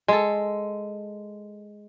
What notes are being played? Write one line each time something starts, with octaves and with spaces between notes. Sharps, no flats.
G#3 A4